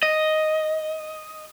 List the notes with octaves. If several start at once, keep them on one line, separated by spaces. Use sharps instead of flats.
D#5